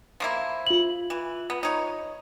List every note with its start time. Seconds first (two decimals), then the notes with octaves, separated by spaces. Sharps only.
0.20 F3 A#3 E4
0.67 F4 F#7
1.10 E3
1.50 B3
1.63 D#4 C#5